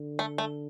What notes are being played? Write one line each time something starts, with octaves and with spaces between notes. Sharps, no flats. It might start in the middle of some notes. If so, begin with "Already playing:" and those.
Already playing: D3
A3
A3